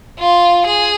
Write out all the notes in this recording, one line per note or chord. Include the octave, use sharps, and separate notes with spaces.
F4
G#4